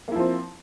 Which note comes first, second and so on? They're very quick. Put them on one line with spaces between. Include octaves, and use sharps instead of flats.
A#3 E4 F3 C4